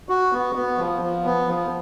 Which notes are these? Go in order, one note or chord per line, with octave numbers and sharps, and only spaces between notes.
F#4
B3
B3
F3
F3
B3
F3